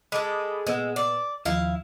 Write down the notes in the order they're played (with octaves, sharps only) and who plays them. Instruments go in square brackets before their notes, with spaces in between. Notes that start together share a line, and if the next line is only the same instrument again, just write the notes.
[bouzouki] G#3 A4 [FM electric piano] B5 D6 D#6
[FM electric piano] A#2 B3 E6 [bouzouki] G#3
[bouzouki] D5
[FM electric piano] D#2 F3 [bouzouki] E4 F5